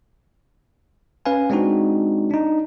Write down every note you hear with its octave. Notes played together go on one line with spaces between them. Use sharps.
C#4 B4 F5 G#5
G#3 C4 D4 D#4 F#4
D4 D#4